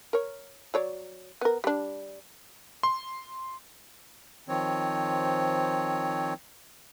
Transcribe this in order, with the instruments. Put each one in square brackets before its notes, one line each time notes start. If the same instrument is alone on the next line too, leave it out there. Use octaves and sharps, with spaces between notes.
[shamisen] A#4 C#5
F#3 C#5 D5
B3 A#4
G3 D4
[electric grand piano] C6
[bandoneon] D#3 F3 C4 C#5